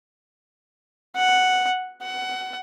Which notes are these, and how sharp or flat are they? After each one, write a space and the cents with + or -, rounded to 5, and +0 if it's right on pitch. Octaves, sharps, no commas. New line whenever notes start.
F#5 +0
F#5 +20